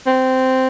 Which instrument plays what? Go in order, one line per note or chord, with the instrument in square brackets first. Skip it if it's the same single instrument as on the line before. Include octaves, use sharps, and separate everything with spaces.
[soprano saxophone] C4